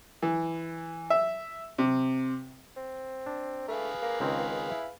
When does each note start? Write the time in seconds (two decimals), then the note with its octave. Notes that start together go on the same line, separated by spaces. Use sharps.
0.22 E3
1.10 E5
1.78 C3
2.76 C4
3.26 D4
3.68 A3 G#4 B4 F5
4.03 A#3
4.20 C#2 D#3 C4
4.70 E4